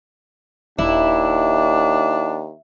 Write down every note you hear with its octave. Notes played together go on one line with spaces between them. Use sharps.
D#1 D#2 D4 E4